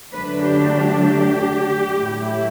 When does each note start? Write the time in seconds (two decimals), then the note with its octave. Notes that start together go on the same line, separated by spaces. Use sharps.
0.13 D3 F#3 A3 D4 B4
0.44 G4
0.74 G4
1.05 G4
1.96 A2 F#3 A3 E4